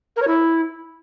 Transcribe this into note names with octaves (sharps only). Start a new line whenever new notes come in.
A#4
C#5
E4